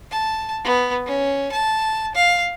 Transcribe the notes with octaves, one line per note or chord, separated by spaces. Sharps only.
A5
B3
C#4
A5
F5